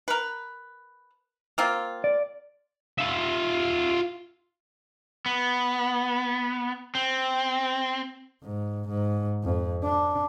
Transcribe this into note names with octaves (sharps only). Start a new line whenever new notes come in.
A#4 B4
A#3 C4 F4
D5
F4 E5
B3
C4
G#2
G#2
F2
D4